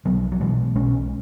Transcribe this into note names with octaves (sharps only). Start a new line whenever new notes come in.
B1 F#3 B3
F#3
B2 E3 G#3
B1 G#3 C#4